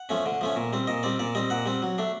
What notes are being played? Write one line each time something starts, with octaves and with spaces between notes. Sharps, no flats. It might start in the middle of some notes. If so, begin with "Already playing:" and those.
Already playing: F#5
F3 A3 C#4
D3
F3 A3 C#4
A#2
G3 C4
A#2 D#5
G3 C4 D5
A#2 D5
G3 C4 D#5
A#2 F#5
G3 C4
F#3
A3 D4